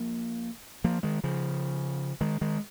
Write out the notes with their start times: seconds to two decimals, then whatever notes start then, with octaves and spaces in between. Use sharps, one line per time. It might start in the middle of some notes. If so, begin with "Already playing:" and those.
Already playing: F3 A#3
0.84 F3 A#3
1.03 D#3 G#3
1.24 C#3 F3
2.21 D#3 G#3
2.41 D#3 G#3